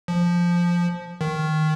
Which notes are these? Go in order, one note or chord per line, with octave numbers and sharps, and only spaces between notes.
F3
D#3